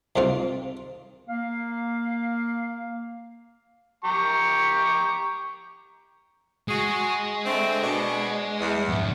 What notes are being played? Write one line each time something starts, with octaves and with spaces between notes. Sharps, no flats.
C2 G#2 C4 F4
A#3 F5
G4 A#5 C#6
G#3 F#4 G#4
D3 A3 C4
B2 D4
E2
F2 G#2